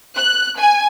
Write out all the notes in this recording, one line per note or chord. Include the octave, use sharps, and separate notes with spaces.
F#6
G#5